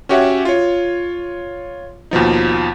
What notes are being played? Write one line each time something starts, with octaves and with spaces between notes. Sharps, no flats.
C#4 F#4 G4 C#5 E5 F#5
F4 C#5
D#2 B2 F3 D#4